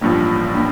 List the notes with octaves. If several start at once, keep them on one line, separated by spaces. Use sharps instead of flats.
A1 G2 F3 A#3 D4
A#3 D4